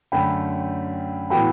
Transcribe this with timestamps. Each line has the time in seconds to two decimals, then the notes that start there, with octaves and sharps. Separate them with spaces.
0.12 F#2 D3 A3 C#4 G5 B5
1.30 A2 E3 B3 F#4 A4 G5 B5